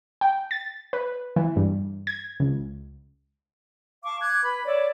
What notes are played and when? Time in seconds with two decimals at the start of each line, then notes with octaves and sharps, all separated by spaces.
0.21 G5
0.51 A6
0.93 B4
1.36 E3
1.56 G2
2.07 G#6
2.40 C#2
4.04 F5 A5 C#6 D6
4.21 D6 F#6 G#6
4.42 B4 B5
4.65 C#5 D5 E5